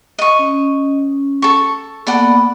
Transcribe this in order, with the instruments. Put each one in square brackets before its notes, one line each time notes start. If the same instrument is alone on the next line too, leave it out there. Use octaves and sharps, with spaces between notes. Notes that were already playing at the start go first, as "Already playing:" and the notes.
[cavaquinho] D#5 C#6
[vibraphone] C#4
[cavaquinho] A4 C#6
[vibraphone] A#3 B3 B5 [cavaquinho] A4 D5 F#5